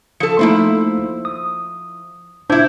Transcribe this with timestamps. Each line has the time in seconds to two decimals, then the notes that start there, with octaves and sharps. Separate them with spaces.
0.20 F3 A4 C#7
0.39 F3 A3 A#3 D#4 E4 C5
1.25 D#6
2.50 A#2 D4 E4 C5 G6